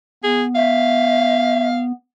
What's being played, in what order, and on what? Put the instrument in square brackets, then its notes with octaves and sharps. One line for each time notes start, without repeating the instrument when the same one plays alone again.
[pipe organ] B3 [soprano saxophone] G#4
[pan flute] E5 [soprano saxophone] F5